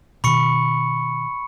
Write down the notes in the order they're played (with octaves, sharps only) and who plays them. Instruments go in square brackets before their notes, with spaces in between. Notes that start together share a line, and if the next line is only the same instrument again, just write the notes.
[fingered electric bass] B2 D#3 [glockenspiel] B5 C#6 C#7